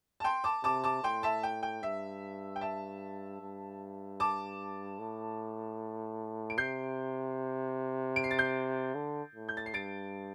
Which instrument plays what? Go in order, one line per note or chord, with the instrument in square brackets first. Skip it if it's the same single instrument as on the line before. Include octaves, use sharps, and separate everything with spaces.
[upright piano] A5
G5 C6
A5 D6
[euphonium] C3 [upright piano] A5 D6
[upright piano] A5 D6
[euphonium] A2 [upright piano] G5 C6
[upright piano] E5 A5
G5
G5
[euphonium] G2 [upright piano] E5
[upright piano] G5
E5 A5
[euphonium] G2
[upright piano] A5 D6
[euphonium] A2
[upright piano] D7
[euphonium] C3 [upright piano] G6 C7
[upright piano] D7
C7
A6
G6 C7
[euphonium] D3
A2
[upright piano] G6
A6
C7
[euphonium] G2 [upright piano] A6 D7